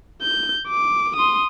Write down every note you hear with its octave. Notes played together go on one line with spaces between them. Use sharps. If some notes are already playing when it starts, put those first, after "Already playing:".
G6
D6
C6 D#6